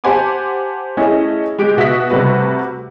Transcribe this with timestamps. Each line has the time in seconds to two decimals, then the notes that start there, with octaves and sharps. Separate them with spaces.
0.04 G4 C5 F#5 G#5 A5 D6
0.97 A3 C#4 E4 G#4 D#5 G#5
1.59 G#3 G4 D7
1.77 B2 F#4 E5 D#6 B6
2.10 C3 G3 A3 F#4 B4